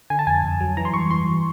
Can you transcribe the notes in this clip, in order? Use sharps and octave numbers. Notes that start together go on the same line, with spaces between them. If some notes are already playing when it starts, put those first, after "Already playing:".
D3 G#5
A5
F2 G#5
F2
F#3
E3 A#5
C6
G2 C#6
E3 C6